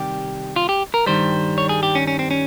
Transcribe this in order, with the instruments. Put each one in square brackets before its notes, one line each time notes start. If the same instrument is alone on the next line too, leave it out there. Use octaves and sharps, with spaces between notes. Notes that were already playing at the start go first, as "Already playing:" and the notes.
Already playing: [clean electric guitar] C3 D#3 G3 G4
F4
G4
A#4
G2 D#3 G3 C5
C#5
G#4
G4
C#4
C#4
C4
C#4